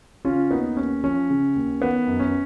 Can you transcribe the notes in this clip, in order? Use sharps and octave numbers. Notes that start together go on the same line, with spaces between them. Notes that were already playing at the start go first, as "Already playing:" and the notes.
C#3 C#4 F4
D#2 B3 D#4
D#2 C#4
F3 C#4
C#3
D#2
D#3 B3
F#2
C#4